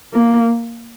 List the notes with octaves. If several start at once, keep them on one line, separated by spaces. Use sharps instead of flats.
A#3